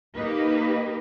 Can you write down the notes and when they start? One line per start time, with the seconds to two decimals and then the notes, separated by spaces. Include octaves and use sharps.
0.15 A#3 D#4 G4 B4